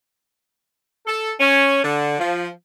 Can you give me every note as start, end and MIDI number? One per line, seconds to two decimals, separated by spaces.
1.06 1.32 69
1.40 1.82 61
1.83 2.17 50
2.19 2.48 53